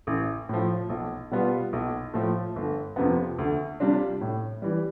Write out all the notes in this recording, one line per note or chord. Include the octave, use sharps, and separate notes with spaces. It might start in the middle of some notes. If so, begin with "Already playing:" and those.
A1
A2 F3
B1
B2 G3 B3 F4
B1
A2 F3 A3
G1
F2 C3 F3 B3
D2
C3 G3 D4 F4
A2
E3 G3